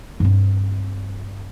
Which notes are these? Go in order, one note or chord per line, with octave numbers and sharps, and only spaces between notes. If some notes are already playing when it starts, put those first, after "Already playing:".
G2 C4